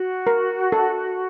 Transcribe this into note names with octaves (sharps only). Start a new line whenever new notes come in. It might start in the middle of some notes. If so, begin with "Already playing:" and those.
Already playing: F#4
A#4
A4